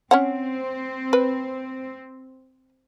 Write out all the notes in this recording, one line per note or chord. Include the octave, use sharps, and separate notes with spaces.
C4 C#4 C#5 F#5
B4